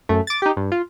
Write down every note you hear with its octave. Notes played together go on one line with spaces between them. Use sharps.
F#2 A3
D6 A6
D#4 G4
G2
F4